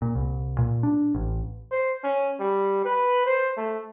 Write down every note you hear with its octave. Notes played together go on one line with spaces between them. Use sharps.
A#2
C2
A#2
D4
A1
C5
C#4
G3
B4
C5
A3